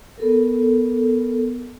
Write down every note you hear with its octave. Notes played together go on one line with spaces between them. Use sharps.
B3 A4 A#4